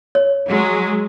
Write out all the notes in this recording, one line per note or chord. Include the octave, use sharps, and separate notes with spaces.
C#5
F#3 G#3